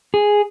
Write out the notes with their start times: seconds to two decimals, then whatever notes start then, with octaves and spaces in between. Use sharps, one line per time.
0.14 G#4